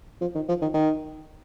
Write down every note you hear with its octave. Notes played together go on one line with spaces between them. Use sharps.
F3
D#3
F3
D#3
D#3